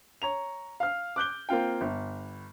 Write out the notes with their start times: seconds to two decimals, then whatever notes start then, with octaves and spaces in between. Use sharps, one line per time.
0.22 C#5 A#5 F7
0.80 F5 F6
1.16 D6 F#6 G6 G7
1.49 A#3 C4 F4 G5
1.81 G1